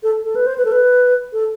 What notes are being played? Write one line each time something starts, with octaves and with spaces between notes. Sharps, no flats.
A4
A4
B4
C5
B4
A4
B4
A4